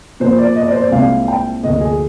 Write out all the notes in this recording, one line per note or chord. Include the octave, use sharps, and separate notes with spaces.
A#2 F3 A#3 C5
D5
D#5
D5
C5
D5
C2 A#2 G#3 C4 F5
G5
D2 D3 F3 A#3 D#5
G#4